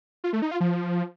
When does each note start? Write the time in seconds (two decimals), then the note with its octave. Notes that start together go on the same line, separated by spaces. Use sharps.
0.24 F4
0.33 A3
0.42 D#4
0.51 F4
0.61 F3